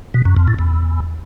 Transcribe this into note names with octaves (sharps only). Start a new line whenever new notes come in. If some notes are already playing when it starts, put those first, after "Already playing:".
B2
F#2
F2
A2
E2